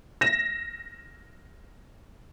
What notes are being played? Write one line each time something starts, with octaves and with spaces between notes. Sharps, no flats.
A#6 E7